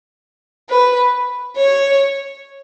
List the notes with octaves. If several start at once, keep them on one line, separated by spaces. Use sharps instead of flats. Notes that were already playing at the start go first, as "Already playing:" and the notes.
B4
C#5